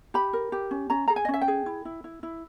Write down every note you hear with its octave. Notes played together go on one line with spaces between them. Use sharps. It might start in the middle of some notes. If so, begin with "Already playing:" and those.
G4 B5
A#4
G4
C#4
C#4 A#5
G#4 A#5
G#5
D#5
C#4
E5
G5
G#4
E4
E4
E4
E4